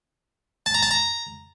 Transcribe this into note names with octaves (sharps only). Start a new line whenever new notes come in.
A5
A#5
A5
A#5